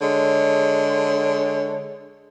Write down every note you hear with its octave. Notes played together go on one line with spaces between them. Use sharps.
D3 G#3 C#5